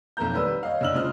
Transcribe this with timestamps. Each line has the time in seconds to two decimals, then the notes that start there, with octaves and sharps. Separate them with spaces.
0.17 B1 F2 A3 A#3 A#5 G6
0.34 D#2 G3 B4 E6
0.63 C#5 D#5 F5
0.81 F#1 D4 D#4 E6 F6 F#7
0.94 C#3 G#3 F4 C5 D#6 F6